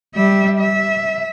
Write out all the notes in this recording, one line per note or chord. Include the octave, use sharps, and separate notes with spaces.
G3 E5
E5